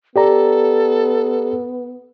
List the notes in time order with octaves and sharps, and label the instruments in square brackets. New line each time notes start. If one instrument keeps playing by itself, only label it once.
[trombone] B3 [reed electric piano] G4 D5 A#5 [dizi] A4